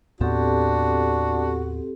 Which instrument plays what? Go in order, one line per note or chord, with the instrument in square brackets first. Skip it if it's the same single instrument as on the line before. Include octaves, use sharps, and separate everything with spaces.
[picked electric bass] D#2 A2 B3 [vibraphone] C4 G4 A4 [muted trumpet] D4 [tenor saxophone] F#4